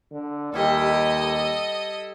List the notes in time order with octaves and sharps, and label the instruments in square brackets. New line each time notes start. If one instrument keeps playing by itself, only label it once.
[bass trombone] D3
[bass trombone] D#2 [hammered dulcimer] G3 E4 G4 [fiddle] A4 D#5